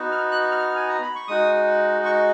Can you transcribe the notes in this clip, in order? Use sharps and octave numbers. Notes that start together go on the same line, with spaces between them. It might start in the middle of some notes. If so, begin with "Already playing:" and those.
Already playing: B3 D#4 F#4
F6
F#6
F6
G#5
A#5
B5
C#6
G#3 D#4 F#4 D#6
C#6